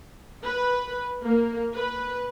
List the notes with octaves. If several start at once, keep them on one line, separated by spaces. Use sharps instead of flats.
B4
A#3
B4